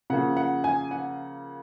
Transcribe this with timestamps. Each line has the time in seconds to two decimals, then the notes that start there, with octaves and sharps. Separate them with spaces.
0.10 C#3 F3 A#3 F#5
0.37 F#5
0.64 G#5
0.91 F#5